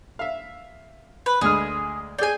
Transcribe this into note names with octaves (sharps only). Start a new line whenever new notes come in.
E5 F5
B4
D2 G#3 G#4 F6
G#4 D5 G5 G#5